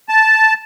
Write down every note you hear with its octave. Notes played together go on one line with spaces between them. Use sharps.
A5